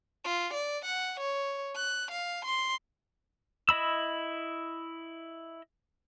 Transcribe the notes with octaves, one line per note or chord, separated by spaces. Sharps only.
F4
D5
F#5
C#5
F#6
F5
C6
E4 D#5 B5 E6